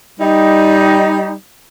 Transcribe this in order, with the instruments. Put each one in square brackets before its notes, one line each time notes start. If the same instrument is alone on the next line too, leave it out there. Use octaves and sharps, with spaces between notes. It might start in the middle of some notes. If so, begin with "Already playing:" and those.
[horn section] G3 D#4